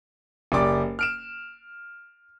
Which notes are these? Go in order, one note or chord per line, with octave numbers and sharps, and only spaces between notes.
F#1 G4 D5 D6
F6 D7 E7